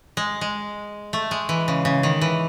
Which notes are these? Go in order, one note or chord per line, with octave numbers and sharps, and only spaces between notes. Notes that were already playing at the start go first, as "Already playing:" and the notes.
G#3
G#3
A3
G#3
E3
C#3
C#3
D#3
E3